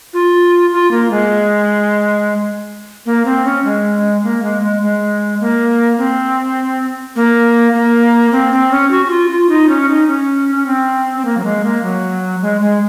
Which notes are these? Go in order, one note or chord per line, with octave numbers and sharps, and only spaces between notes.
F4
F4
A#3
G#3
A#3
C4
C#4
G#3
A#3
G#3
G#3
G#3
A#3
C4
A#3
A#3
C4
C4
C#4
F#4
F#4
F4
F4
D#4
C#4
D#4
C#4
C#4
C4
C4
A#3
F#3
G#3
A#3
F#3
G#3
G#3